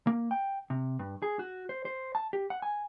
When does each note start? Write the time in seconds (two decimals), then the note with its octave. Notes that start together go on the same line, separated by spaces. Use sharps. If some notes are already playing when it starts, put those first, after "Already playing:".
0.07 A#3
0.31 G5
0.70 C3
0.99 G2
1.22 G#4
1.39 F#4
1.69 C5
1.85 C5
2.15 A5
2.33 G4
2.50 F#5
2.62 G#5